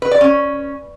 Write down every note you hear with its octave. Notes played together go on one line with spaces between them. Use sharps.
B4
D5
C#4